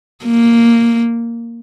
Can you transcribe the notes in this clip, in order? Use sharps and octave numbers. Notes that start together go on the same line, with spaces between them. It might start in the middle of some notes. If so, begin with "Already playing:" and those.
A#3